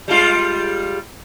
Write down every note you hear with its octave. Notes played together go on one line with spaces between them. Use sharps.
G3 G#3 F4